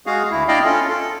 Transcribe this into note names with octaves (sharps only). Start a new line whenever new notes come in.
G#3 F#4 G#4 F5
D2 E4
D4 E4 D5 D#5 F5 G5
C#4 F4 A4
A4